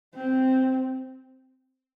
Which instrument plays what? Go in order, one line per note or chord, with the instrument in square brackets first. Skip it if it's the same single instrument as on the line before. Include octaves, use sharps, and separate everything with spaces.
[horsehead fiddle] C4